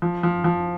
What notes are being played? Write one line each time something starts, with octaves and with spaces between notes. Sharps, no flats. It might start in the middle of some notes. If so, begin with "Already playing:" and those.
F3
F3
F3